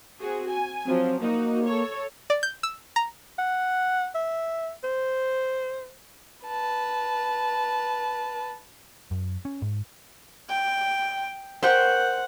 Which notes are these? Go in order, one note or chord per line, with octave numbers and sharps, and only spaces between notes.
C4 F#4 G#4
G#5
F3 F#3 C4
A#3 D#4 F#4
A4 C#5
D5
G6
E6
A#5
F#5
E5
C5
B4 A5
F#2
C#4
G#2
G5
A#4 C5 F#5 G5 C#6 G6